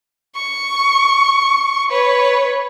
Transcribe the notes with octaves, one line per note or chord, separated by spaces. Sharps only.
C#6
B4 C#5